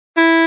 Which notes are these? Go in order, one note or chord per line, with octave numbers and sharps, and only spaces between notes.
E4